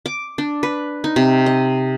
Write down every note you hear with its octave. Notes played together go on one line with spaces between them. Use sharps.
D6
D4
B4
D#4
C3
D#5